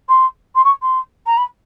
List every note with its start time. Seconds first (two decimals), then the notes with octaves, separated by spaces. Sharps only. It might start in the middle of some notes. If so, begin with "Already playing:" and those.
0.09 C6
0.55 C6
0.64 C#6
0.82 C6
1.26 A#5
1.37 B5